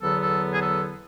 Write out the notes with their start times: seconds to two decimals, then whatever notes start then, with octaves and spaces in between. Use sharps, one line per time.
0.01 E2 D3 F#3 B3 A4
0.20 A4
0.53 G#4
0.60 A4